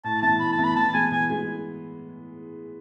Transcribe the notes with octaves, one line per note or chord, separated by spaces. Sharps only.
A2 A5
E3 B3 E4 A5
A2 B5
A5
E3 B3 E4
B5
E3 A5
G#3 B3 G#5
E3 G#5
G#3 B3